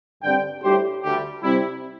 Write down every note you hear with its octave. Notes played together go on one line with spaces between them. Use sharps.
G2 D3 G3 C4 D5 G5
A2 G3 D4 G4 C5
D2 D3 G3 G4
C3 G3 C4 E4